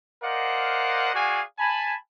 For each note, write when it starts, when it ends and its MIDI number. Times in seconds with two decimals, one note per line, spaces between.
0.24 1.10 70
0.24 1.10 72
0.24 1.10 74
0.24 1.10 75
0.24 1.10 77
0.24 1.10 78
1.14 1.41 66
1.14 1.41 68
1.14 1.41 74
1.14 1.41 77
1.14 1.41 78
1.14 1.41 80
1.59 1.94 80
1.59 1.94 81
1.59 1.94 83